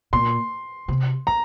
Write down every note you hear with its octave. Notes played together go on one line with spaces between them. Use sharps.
A#2 C6
C3
A#5